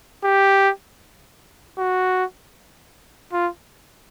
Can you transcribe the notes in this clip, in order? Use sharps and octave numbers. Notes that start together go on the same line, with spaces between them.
G4
F#4
F4